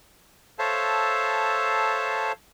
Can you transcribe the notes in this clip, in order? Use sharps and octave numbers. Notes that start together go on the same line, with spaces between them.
A4 C5 C#5 E5 F5 A5